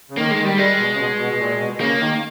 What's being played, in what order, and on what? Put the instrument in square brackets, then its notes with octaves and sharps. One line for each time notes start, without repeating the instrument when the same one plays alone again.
[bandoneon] C#3
[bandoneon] D#3 [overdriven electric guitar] A#3
[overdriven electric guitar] G#3
[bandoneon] D#3
[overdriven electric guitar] G3
[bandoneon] G3 [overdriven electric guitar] G#3
[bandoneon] B2
C#3
B2
B2
B2
A#2
B2
[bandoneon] C#3 [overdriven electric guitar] A#3
[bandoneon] D#3